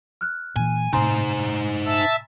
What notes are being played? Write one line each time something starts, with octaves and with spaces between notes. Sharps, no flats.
F6 F#6
A#2 E3 G#5
A2 C3 D#4 C5 G#5 A#5 C6
E5 A5 E6